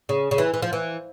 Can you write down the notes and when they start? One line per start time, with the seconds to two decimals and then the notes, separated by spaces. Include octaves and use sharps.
0.09 C#3
0.31 C#3
0.38 E3
0.54 E3
0.62 F3
0.73 E3